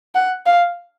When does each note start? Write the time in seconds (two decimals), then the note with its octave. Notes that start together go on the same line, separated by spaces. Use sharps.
0.15 F#5
0.46 F5